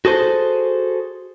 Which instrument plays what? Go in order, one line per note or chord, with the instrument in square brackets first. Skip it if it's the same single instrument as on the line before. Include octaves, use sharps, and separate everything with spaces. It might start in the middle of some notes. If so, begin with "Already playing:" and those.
[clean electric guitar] F#4 G#4 A4 C5